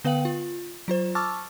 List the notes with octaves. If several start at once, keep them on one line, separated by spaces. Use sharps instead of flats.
D3 B3 B4 F5 G5 F#7
F4
F#3 F4 C5
A5 C#6 D6 E6 F6 A6